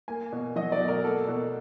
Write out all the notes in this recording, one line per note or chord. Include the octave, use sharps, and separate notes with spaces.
A#3 G#5
B2
F#3 D#5
D5
B2
A#4
A#4
A#3 A4
B2